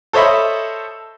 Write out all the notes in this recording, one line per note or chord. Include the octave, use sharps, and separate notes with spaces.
A4 C5 C#5 D#5 E5 B5